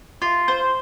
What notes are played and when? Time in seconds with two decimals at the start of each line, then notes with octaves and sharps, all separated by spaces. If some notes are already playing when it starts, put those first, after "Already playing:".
0.22 F4
0.48 C5